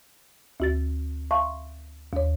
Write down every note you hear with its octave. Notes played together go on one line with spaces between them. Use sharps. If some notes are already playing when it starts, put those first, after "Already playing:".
D2 F#4 A6
E5 F5 A5 C6 C#6
D#2 C#5